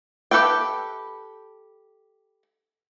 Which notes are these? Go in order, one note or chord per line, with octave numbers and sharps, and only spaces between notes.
G4 A4 B4 E5 G5